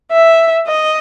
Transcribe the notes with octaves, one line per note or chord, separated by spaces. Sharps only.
E5
D#5